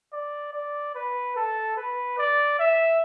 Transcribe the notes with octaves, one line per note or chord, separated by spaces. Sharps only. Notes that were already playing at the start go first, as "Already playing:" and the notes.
D5
D5
B4
A4
B4
D5
E5